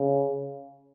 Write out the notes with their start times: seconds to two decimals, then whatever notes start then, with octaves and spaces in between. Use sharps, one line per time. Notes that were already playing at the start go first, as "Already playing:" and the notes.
Already playing: C#3